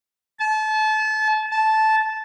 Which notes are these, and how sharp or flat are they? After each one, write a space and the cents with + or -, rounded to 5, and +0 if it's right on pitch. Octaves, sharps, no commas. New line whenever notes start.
A5 -30
A5 -10